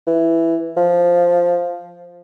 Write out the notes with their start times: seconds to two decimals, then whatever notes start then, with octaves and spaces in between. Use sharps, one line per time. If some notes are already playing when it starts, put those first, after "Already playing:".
0.07 E3
0.77 F3